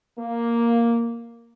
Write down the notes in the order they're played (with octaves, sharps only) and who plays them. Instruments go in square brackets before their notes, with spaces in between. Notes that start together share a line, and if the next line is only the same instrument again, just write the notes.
[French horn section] A#3